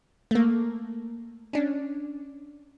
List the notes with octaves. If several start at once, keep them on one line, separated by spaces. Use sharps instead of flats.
A3 A#3
C#4 D4